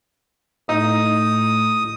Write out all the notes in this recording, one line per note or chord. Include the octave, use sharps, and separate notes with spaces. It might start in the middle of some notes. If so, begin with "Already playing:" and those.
A2 D#4 D#6